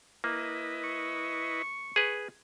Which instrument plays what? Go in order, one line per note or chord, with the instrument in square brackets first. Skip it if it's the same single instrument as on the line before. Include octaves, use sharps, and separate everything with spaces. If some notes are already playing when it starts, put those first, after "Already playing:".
[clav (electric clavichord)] A#3 [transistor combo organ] E4 B4 D#5
[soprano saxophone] C#6
[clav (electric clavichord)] G#4 B4